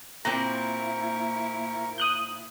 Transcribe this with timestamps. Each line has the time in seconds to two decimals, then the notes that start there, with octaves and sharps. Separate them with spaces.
0.25 A#2 A#3 C4 E4 A#4 A#5 C#6
1.98 D#6 F#6 G6